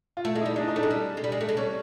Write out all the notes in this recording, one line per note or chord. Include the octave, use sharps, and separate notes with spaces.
F4
A3 E4
G#3 E4
D#4
G3
G#3 D4
D#4
A3 D4
G#3
G3
G#3
G3
G#3
A3
G#3
G3 C#4